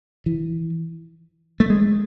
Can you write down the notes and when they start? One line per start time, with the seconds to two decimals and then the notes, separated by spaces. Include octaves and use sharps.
0.26 E3
1.60 A3
1.70 G#3